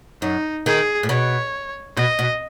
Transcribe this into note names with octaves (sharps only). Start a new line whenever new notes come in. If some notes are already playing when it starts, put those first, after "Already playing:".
F#2 D#4
D#3 G#4
A2
B2 C#5
B2 D#5
B2